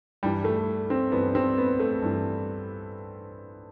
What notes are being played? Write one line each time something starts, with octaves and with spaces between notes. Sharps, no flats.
G2 E3 G3
A3
C4
G2 E3 B3
C4
B3
A3
G2 E3